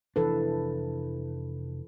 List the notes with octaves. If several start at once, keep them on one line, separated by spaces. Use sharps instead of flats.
F1 E3 D4 A4 B4